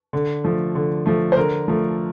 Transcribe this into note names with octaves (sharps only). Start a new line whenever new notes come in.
D3
F3 A3
D3
F3 A3
C5
D3 A#4
F3 A3